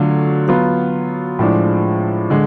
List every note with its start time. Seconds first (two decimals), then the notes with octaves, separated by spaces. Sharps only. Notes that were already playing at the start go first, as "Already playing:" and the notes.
Already playing: D3 F#3 A3 F4
0.48 F#3 B3 F4
1.39 A2 F3 G#3 D4
2.30 D3 G#3